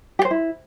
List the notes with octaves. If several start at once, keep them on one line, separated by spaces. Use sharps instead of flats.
G4
C5
E4